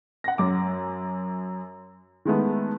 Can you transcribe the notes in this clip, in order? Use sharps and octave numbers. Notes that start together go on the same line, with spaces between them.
F#5 A#6
F#2 D6
D#3 G#3 A3 B3